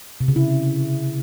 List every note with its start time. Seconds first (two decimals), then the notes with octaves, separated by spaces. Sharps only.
0.21 C3
0.28 C#3
0.36 E4